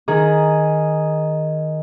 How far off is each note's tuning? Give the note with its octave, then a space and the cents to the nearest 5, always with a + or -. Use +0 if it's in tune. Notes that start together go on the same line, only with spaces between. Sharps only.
D#3 +0 G#4 +0